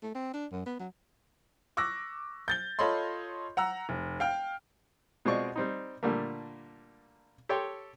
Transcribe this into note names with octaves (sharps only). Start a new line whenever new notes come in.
A3
C4
D4
F#2
B3
F#3
C#6 D6 E6 F#6 A#6
G6 A6 G7
F4 A4 C#5 D#5 B5 C6
F#5 A#5 E6
F1
F5 G5 F6
B2 G#3 C4 F4 D5 C#6
G3 C4 D#4
A#2 D3 G3 A3 A#3
G4 A4 C#5 G5 C6